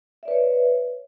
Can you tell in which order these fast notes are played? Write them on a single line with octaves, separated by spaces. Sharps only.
E5 D5 B4 C#5